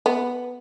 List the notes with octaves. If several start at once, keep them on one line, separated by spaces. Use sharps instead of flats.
B3